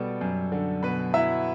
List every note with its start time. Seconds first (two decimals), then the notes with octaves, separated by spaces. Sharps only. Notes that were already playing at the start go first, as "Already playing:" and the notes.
Already playing: B2 G3 A4
0.21 F#2
0.52 D3
0.83 B2 B4 B5
1.14 F#3 E4 E5